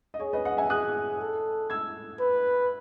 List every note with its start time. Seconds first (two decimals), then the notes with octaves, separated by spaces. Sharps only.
0.14 D#5
0.20 G#4 C#5
0.33 B4 D#5
0.45 D#5 F#5
0.57 E5 G#5
0.70 G#4 D#6 F#6
1.20 A4
1.70 E6 G#6
2.20 B4